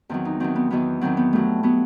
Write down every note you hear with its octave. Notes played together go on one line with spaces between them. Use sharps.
E2 D#3 F#3 C4
D#4
E2 D#3 F#3 C4
B3
E2 D#3 F#3 B3
E2 D#3 F#3 C4
B3
G2 F#3 A3
F#3 B3